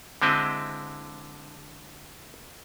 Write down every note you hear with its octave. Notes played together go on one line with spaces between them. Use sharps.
D3 G#3 C4 E4 D#5